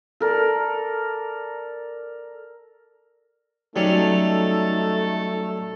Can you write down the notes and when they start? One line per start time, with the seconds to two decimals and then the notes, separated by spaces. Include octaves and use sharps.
0.20 A4 A#4 D5
3.76 F#3 G3 A3 C#4 D#4 A4